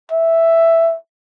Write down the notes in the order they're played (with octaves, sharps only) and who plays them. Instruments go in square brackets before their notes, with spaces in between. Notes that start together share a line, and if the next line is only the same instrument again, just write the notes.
[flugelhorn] E5